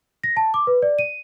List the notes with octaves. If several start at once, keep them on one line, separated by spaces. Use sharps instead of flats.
A#6
A5
D6
B4
D5
D#7